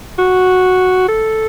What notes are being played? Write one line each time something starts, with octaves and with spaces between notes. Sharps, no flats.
F#4
A4